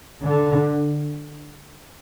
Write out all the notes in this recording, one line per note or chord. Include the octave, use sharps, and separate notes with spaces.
D3